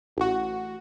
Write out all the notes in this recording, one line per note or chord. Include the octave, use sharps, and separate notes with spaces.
A1 F#4